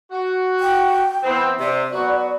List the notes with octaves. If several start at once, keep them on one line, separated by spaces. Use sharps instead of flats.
F#4
G5
E3 B3 C4
C3 D5
F#3 B3 F#4